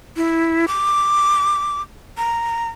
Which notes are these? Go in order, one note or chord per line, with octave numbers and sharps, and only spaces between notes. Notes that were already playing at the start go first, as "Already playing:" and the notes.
E4
D6
A#5